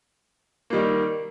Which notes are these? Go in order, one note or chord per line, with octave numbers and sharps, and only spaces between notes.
D#3 G3 A#3